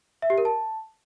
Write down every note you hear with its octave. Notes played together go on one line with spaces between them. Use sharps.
E5
G4
A#4
A5